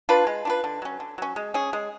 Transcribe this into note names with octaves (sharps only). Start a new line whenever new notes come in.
D4 F4 B4
G#3
D4 F4 B4
D3
F#3 C#4
D3
F#3 C#4
G#3
C#4 G#4
G#3